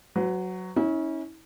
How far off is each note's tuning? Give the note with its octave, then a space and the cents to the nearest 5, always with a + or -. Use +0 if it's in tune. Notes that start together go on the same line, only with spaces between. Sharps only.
F#3 +0 B4 +40
C#4 +0 E4 -40